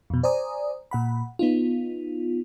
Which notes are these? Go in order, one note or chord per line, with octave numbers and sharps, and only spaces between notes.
F2 B2
C5 D5 G#5 A#5 D#6
A#2 F#5 B5
B3 D#4 F4